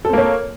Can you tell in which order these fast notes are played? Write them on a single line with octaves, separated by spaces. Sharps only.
A4 C4 A#3 C#5